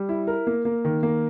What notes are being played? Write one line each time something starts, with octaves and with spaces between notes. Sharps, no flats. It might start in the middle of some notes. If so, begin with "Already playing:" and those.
Already playing: G3
E4
A#4
A#3
A#3
D#3
A#3